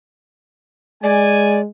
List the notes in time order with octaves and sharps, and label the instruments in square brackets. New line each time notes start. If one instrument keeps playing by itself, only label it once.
[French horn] G#3 [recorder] D5 [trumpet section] G#5